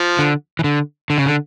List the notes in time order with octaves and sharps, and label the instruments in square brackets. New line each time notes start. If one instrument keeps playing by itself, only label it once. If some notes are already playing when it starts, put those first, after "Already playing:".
Already playing: [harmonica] F3
[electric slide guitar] D3
E3
D3
D3
C#3
D3